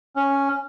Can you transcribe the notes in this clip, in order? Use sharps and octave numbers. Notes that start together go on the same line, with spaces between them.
C#4